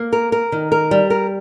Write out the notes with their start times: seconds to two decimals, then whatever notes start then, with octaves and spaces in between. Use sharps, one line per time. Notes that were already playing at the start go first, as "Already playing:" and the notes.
Already playing: A#3
0.13 A#4
0.32 A#4
0.52 D#3
0.72 A#4
0.91 G3
1.10 A#4